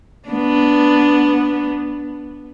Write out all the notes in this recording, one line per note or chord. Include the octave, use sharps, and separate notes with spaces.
B3 D4